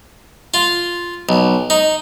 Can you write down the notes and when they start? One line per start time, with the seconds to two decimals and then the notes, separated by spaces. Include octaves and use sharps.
0.54 F4
1.29 B1
1.70 D#4